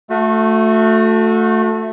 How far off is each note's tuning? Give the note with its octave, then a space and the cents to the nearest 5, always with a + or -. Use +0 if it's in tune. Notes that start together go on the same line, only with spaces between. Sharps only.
A3 +0 F#4 -35